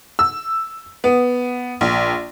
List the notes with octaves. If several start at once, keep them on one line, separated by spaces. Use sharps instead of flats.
E6
B3
A#1